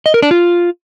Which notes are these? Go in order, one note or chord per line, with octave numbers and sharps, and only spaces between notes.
D#5
A#4
D4
F4